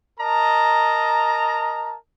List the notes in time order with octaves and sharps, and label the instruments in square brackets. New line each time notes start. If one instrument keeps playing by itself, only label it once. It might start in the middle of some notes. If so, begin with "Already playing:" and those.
[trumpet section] A#4 D#5 A5 A#5